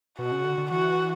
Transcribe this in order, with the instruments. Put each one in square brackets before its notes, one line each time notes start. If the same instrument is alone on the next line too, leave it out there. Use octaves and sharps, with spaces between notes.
[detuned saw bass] B2 [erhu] F#4
[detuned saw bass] C#3
D3
D3
[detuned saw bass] E3 [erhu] F#4